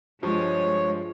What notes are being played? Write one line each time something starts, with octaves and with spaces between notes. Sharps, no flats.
G2 F3 G#3 C#5